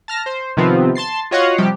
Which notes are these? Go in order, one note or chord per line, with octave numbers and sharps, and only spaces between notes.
A5 F6 A#6
C5
C3 D#3 F3 B3 C4 F4
A5 C6 A6 C7
F4 F#4 C#5 D#5 F5 F#5
C3 F3 G3 G4